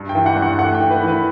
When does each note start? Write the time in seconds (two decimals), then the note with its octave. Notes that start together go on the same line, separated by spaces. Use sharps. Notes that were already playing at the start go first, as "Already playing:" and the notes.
Already playing: G2
0.09 G5
0.15 E3
0.26 F#5
0.36 G2
0.42 F#5
0.58 A3 F#5
0.75 G5
0.80 E3
0.90 B4
1.02 E3
1.07 B4